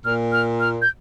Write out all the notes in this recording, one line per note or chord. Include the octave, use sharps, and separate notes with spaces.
A#2 F6
F6
F6
G6